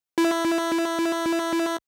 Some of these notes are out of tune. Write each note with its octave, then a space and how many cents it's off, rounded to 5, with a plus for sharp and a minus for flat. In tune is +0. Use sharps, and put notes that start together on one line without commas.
E4 +15